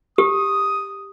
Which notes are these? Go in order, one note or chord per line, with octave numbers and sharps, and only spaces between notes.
G4 D#6